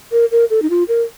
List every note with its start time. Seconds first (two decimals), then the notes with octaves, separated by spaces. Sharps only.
0.12 A#4
0.31 A#4
0.50 A4
0.62 D#4
0.70 F4
0.88 A#4